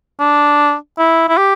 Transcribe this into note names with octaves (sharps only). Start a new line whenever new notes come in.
D4
E4
E4
G4